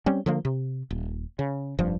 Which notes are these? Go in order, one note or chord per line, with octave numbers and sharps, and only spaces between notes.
G3 C4 C#4
D3 F3 A#3
C3
D#1
C#3
F1 G2 F3